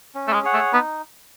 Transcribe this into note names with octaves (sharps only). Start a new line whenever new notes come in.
C#4
A3
G#3
G#4 C#5 F#5
A3
B3 D#4